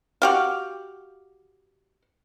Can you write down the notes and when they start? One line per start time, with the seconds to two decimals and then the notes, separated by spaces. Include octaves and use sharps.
0.22 F#4 G4 F5